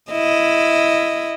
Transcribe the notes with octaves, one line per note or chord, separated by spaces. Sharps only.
E4 D#5